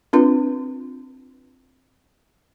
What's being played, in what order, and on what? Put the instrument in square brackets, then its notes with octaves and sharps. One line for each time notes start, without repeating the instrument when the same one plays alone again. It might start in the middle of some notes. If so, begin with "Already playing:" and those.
[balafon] C4 D4 F4 B4